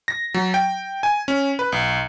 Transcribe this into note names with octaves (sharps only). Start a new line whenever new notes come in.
A#6
F#3
G5
G#5
C#4
B4
B1